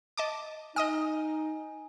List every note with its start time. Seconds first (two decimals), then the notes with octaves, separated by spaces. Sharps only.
0.17 D#5 A5 D6
0.76 D#4 D#5 G#5 D#6 F6